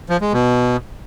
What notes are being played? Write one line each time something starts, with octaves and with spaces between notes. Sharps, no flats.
F3
G#3
B2